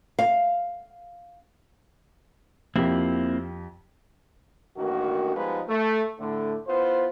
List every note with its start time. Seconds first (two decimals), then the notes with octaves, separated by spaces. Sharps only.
0.19 F5
2.76 F2 A#3 C4 E4 G4
4.76 A1 G2 D#3 A#3 F#4
5.36 F3 G3 G#3 B3 D#4 B4
5.68 A3
6.19 A2 D3 A3
6.68 B3 E4 F4 C5